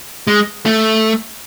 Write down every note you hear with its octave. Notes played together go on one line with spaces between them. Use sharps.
G#3
A3